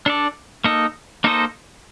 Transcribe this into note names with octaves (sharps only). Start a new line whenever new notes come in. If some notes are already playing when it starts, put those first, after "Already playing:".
D4 A4 D5
A#3 D#4 A4 D#5
A#3 D#4 A4 C5 D#5